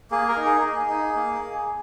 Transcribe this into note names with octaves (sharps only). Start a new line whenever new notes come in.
A#3 G#4
A#4
D#4
G#4
A#3
D#4
A#3